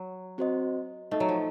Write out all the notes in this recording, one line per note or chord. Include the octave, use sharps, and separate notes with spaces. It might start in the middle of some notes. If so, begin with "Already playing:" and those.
Already playing: F#3
C4 F#4 C5 D#5
A3 D#4 A4 D#5
F#3
F3